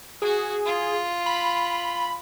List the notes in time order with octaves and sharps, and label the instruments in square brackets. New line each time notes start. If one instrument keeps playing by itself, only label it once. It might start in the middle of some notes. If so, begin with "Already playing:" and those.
[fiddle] F#4 [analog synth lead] G#4
[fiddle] F4
[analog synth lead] B5